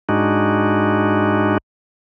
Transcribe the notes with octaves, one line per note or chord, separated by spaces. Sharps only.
G#2 G#3 D4 D#4 F#4